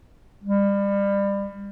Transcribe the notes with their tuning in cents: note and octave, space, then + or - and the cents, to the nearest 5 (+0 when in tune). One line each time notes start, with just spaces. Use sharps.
G3 +30